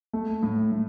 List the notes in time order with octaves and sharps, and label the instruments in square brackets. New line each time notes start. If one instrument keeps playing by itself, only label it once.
[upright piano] A3
A2
A2